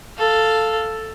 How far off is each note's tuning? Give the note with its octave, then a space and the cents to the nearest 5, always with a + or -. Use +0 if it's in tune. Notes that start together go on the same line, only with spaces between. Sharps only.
A4 +5 F5 +0